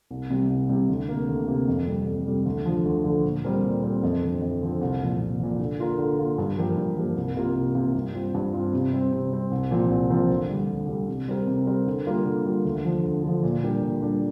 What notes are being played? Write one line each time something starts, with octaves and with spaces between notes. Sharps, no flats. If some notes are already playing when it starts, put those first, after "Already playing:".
C2
C3 G3
C2
C3 G3
D2
C3 A#3
D2
C3 A#3
F2
C3 G3
F2
C3 G3
D2
D3 F3
D2
D3 F3
A#2
G3 C4 A#4
A#2
G3 C4 A#4
F2
D3 F3 C4
F2
D3 F3 C4
C2
A#2 F3
C2
A#2 F3
D3
A#3 F4 A#4
D3
A#3 F4 A#4
G2
F3 A#3 G4 A#4
G2
F3 A#3 G4 A#4
C2
C3 A#3 F4
C2
C3 A#3 F4
G2
G3 C4 F4
G2
G3 C4 F4
C3
G3 C4
C3
G3 C4
C2
A#2 F3 C4 A#4
C2
A#2 F3 C4 A#4
D2
D3 G3
D2
D3 G3
C3
G3 C4 G4 A#4
C3
G3 C4 G4 A#4
D3
G3 A#3 F4
D3
G3 A#3 F4
D2
D3 F3
D2
D3 F3
A#2
G3 D4 G4 A#4
A#2
G3 D4 G4 A#4